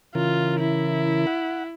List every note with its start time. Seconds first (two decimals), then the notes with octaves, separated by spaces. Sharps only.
0.15 C#3 E3 F4 A#4
0.60 E4
1.27 F#5